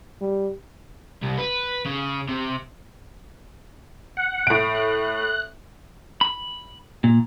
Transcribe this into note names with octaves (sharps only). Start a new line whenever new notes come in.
G3
C2
B4
C#3
C3
F#5
A2 D7
F#6
B5
A#2